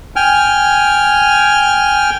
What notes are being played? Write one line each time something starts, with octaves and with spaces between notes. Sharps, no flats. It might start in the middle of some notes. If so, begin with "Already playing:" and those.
G5 G#5 F6